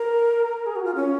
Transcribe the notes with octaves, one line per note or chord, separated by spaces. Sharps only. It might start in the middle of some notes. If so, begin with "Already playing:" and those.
Already playing: A#4
G#4
F#4
F4
C#4